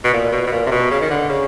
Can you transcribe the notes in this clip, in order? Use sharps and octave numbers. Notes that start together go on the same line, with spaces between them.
B2
A#2
B2
B2
A#2
C3
B2
C#3
D#3
D3
C#3